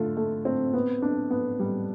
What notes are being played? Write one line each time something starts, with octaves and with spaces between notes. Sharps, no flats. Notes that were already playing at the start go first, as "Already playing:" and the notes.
Already playing: D3 A3 F4
A3
C4
B3
D4
B3
G3